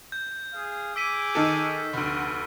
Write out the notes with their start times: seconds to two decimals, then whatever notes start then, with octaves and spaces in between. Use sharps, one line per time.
0.12 G6
0.54 G#4 F5 D#6
0.96 G#4 D6 E6 B6 D#7
1.35 D#3 A4
1.93 F1 D2 B3 D4 F#4